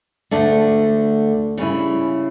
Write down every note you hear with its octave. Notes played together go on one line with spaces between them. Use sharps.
D2 D3 A3 D4
C#3 G3 C#4 E4